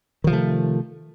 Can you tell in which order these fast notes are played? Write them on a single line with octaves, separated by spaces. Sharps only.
D#3 F3 C3 A3